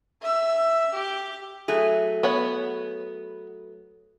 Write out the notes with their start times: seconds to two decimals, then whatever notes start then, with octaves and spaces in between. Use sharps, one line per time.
0.22 E5 E6
0.93 G4
1.68 F#3 A3 G#4
2.23 B3 C#5 B5